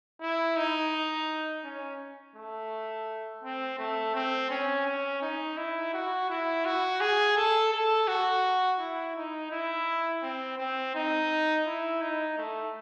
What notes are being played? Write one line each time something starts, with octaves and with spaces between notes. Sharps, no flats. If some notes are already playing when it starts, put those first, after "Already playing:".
E4
D#4
C#4
A3
C4
A3
C4
C#4
C#4
D#4
E4
F#4
E4
F#4
G#4
A4
A4
F#4
E4
D#4
E4
C4
C4
D#4
E4
D#4
A3